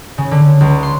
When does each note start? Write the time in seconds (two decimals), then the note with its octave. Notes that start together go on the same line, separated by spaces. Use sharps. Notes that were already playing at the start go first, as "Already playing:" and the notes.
0.18 C#3
0.31 D3
0.61 C#2
0.83 C6